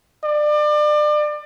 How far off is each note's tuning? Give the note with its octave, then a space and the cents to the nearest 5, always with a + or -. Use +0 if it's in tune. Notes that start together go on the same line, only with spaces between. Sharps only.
D5 +30